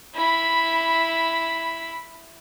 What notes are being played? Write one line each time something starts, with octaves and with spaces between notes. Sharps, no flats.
E4 B5